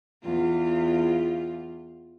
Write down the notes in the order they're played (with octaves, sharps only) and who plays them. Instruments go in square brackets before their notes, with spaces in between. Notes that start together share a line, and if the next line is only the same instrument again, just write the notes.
[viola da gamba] E2 F4